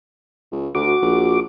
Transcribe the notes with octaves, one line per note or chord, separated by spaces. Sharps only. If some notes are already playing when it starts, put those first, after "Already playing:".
C#2
D2 F#4 D6
A#1